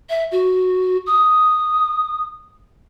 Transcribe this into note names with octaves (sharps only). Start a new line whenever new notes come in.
E5
F#4
D#6